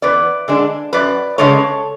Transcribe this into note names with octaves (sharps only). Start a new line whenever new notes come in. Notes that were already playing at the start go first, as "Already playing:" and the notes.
E2 B4 D5
D3 G#3 D4
F#2 B4 D5
C#3 G#3 D4 A4 C#5